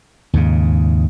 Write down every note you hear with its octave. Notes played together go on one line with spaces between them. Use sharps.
D#2 G#2 C#3